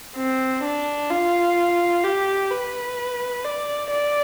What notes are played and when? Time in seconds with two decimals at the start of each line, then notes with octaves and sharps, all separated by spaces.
0.16 C4
0.63 D4
1.10 F4
2.04 G4
2.51 B4
3.44 D5
3.91 D5